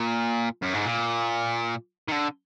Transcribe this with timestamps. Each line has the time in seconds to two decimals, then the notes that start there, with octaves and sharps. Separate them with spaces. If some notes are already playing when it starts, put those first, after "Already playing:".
Already playing: A#2
0.63 F#2
0.74 G#2
0.85 A#2
2.08 D#3
2.12 D3